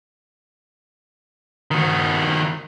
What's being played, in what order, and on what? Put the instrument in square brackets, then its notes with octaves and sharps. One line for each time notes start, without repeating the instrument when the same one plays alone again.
[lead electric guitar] D#3 F#4